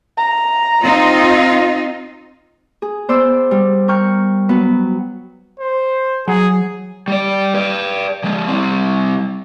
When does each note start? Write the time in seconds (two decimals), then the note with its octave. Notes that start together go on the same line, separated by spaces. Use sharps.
0.18 A#5
0.83 C4 D#4 F4
2.82 G#4
3.09 B3 C5 D5 E6
3.51 G3
3.88 A#4 G5 C#6 F6 G6
4.49 F#3 B3 B4
5.60 C5
6.28 F#3 G#4 F#5 A#5
7.08 G3 D5
7.54 B4 D5
8.24 F3 G#3
8.48 G3 C4